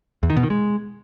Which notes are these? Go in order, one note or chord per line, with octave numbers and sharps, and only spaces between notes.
E2
D#3
B2
D#3
G#3